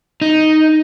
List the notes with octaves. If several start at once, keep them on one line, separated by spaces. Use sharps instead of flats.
D#4